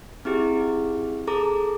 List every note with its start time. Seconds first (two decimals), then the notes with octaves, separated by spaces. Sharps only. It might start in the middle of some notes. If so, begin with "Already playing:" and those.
0.25 C4 E4 G4 G#4
1.27 G#4 A4 A#5 D6